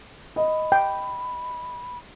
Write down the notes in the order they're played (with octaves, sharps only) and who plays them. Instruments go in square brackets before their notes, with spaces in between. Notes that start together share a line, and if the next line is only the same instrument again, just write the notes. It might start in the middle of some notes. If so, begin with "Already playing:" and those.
[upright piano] D#5 [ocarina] B5
[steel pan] G5